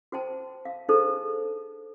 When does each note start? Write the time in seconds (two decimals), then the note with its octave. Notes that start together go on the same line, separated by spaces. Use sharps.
0.12 F#4 C5 G5 A5
0.65 F5
0.89 D4 D#4 G#4 A4 C5 A5